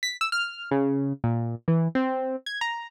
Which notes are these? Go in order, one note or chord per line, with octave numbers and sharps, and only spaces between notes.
B6
E6
F6
C#3
A#2
E3
C4
G#6
A#5